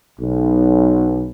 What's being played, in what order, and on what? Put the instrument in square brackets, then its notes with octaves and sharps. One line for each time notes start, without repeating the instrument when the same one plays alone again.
[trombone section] B1